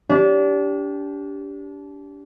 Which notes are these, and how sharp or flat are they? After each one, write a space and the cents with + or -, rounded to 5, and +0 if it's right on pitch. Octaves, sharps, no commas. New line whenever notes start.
D4 -30 G4 +0